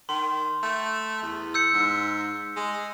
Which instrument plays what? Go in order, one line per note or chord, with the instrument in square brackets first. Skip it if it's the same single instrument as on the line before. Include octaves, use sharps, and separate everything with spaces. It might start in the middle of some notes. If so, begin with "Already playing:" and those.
[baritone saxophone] D#3 [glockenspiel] C6
[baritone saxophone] A3
E2
[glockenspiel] E6 G6 C#7
[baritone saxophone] G#2
G#3